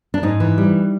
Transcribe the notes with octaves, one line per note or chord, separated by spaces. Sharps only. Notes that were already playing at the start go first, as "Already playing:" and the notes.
D4
G#2 D#4
E3
G3